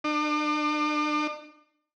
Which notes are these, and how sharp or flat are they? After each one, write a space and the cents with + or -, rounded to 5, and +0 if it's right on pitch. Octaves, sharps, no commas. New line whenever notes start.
D4 +40